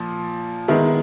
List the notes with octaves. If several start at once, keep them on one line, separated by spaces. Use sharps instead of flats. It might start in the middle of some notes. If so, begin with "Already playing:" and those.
Already playing: A#2 F3
D#3 G#3 B3 E4